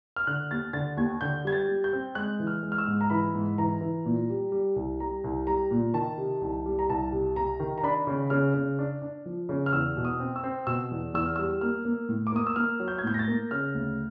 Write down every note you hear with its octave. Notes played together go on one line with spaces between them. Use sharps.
F6
D3 F#6
D#2 A6
D3 A6
D#2 G#6
D3 G6
G3 G#6
A6
G3
G6
C4
G#3 F#6
E3
F6
G#3
F6
E6
G#2
A#5
E3 B5
G#2
E3 A#5
E3
A#2
G3
G3
C2
G3 A#5
C2
G3 A#5
A#2
D#3 A5
C3
C2
G3
A#5
C2 A5
C3
C3 A#5
D#3
A#5
D4 B5
C#3
C#3 F6
C#3
D4
D4
F3
C#3
F6
E2 E6
B2
D#6
C4
E6
C4
B2 E6
E2
E2 E6
F6
G3 E6
A#3 F6
A#3
A2
D6
A#3 D#6
E6
A#3 F6
F#3
G6
G#6
A2 G6
A#6
A6
A#3
C#3 F6
D2